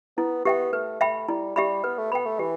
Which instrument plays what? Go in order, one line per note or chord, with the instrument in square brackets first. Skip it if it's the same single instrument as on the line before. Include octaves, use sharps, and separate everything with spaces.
[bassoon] B3 [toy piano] E4
[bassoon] B3 [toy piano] G4 E5 G5
[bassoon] A3 [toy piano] B4
[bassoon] A3 [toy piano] E5 G5 B5
[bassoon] G3 [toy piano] E4
[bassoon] G3 [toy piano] G4 E5 B5
[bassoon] B3 [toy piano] B4
[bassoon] A3
[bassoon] B3 [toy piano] G5 B5
[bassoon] A3
[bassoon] E3 [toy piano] G4